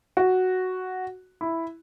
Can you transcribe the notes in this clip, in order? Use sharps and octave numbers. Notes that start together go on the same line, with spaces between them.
F#4
E4